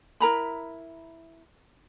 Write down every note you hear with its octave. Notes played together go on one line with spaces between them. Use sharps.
E4 A#4 A#5 B5